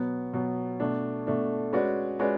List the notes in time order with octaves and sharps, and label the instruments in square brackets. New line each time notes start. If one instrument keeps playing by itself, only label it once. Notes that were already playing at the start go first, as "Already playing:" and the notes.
Already playing: [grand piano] B2 F#3 B3
B2 F#3 B3
B2 A3 D4
B2 A3 D4
G#3 C#4 F#4 B4 D5
G#3 C#4 F#4 B4 D5